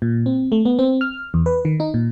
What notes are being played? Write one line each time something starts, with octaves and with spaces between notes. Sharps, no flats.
A#2
C4
A3
B3
C4
F6
E2
B4
D#3
D#4
A#2